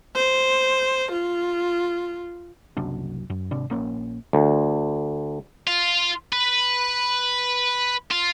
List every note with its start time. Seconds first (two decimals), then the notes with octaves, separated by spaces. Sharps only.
0.15 C5
1.12 F4
2.77 F#1 C2 F#2 D4
3.30 F#2
3.51 G#1 C3 D4
3.70 A#1 A#3 C#4
4.33 D2
5.67 F4
6.32 B4
8.11 F4